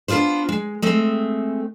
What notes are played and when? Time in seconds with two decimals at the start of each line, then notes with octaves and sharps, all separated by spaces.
0.08 B3 D4 F4 G#4 C5
0.49 G#3
0.82 G#3 A3 C4